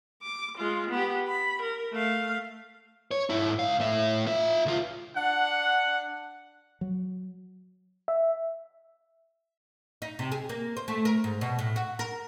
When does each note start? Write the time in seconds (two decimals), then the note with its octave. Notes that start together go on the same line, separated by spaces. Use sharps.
0.23 D6
0.58 G#3 F4
0.91 B3 G4
1.28 B5
1.62 A#4
1.93 A3 F5
3.11 C#5
3.30 G#2 E4
3.59 C#2 F5
3.80 A2 E5
4.26 F4 E5
4.66 C#2 F4
5.16 D4 F#5
6.81 F#3
8.08 E5
10.02 D#4
10.19 C3
10.32 G#4
10.49 A#3
10.77 C5
10.88 A3
11.05 A#4
11.24 G#2
11.41 B2
11.59 A2
11.76 F#4
11.99 A#4